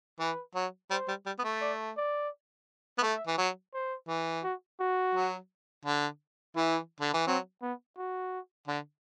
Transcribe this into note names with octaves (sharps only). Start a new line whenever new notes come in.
E3 B4
F#3
G3 C5
G3
G3
B3
A3
D5
D5
B3
A3 E5
E3
F#3
C5
E3
F#4
F#4
F#3
D3
E3 E4
D3
E3
F#3 C4
B3
F#4
D3